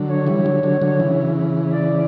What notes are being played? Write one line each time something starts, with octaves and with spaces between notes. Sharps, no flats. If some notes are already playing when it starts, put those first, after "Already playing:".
Already playing: D3 F#3
C#5
E3 G3
D3 F#3
D3 F#3
D3 F#3
C#3 E3
D5